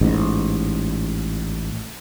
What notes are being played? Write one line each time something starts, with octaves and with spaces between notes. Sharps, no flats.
A1 G#2